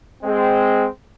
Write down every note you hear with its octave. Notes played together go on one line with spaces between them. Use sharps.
G#3 C4